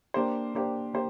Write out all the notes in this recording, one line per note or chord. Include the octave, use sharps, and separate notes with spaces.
A#3 D4 G4 C5
A#3 D4 G4 C5
A#3 G4 C5